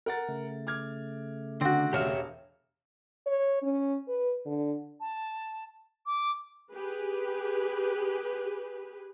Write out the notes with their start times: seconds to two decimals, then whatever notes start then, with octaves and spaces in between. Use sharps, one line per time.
0.06 A#4 F#5 A6
0.29 C#3 A3
0.67 D6 F6 G#6
1.61 D3 C4 F#4
1.93 E1 G4 C#5 E5 F5 F6
3.27 C#5
3.63 C#4
4.08 B4
4.46 D3
5.00 A5
6.06 D6
6.71 G4 G#4 B4